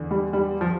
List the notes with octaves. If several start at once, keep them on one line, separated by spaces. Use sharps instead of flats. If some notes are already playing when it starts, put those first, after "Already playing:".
Already playing: E2 D3
G3
G3
F3